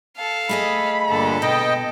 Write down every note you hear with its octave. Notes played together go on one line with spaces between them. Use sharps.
A4 F5
A3 G#4 D#5 B5
G2 A#2 D3 A4
B2 D#5 G5